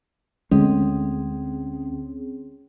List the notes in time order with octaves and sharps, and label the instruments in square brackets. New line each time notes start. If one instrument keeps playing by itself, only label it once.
[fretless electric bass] D2 G#3 [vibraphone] C4 G#4 [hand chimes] C#4